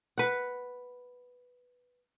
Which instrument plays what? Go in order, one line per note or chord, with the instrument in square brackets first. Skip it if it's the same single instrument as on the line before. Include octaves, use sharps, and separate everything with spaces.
[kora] B4 F#5